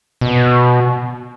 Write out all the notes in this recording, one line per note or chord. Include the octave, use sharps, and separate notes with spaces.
B2